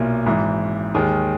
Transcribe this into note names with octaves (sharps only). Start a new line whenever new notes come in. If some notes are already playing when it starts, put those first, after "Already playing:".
Already playing: B1 A#2 A#3 E4
G#1 G#2 E3
D#2 D#3 G#3